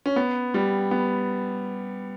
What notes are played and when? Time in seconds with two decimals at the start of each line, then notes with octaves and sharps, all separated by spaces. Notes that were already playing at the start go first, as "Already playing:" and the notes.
0.06 C#4
0.16 B3
0.54 G3
0.91 B3